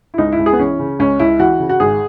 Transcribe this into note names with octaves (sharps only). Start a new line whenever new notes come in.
E4
C#2 D#4
E4
C#2
G#4
B3
E3 C#4
C#3
C#2 C#4
C#2 E4
E3 F#4
C#3
F#4
G#1 G#4